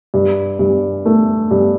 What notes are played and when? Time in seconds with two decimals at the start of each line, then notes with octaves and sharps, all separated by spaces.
0.14 G2
0.59 G2
1.05 A3
1.51 G2